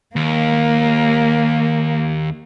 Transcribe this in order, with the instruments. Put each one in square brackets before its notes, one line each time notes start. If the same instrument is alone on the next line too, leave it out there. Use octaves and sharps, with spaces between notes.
[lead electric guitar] D#2 [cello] A#3